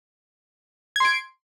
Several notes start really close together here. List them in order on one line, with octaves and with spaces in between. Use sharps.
G#6 C6 D7